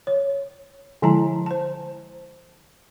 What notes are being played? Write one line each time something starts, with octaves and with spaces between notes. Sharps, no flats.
C#5
D3 F3 G#3 E4 A5 A#5
C5 A5